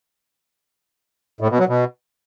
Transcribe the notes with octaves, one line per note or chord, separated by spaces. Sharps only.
A2
B2
F#3
B2